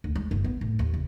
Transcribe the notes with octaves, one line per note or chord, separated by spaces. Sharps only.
D2
G#3
G1
B3
A2
D#2
F#1